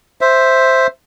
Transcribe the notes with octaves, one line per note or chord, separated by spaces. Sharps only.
C5 E5